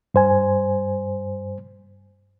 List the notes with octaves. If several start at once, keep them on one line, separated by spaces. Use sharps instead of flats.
G2 C5 G#5